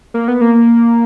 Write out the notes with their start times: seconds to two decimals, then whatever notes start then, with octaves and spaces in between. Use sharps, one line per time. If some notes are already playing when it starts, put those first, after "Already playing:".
0.14 A#3
0.28 B3
0.41 A#3